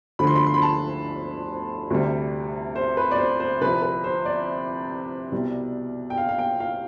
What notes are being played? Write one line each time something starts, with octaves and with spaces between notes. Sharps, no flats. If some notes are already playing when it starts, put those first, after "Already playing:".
D2 D3 F3 B5
C6
B5
C6
B5
A5
D2 C3 G3
C5
B4
D5
C5
C5
C2 C3 F3 B4
B4
C5
D5
C2 B2 G3
G5
F5
F5
G5
F5